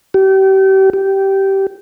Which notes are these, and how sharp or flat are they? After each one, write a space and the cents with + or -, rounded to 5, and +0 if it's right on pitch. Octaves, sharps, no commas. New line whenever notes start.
G4 -35
G4 -15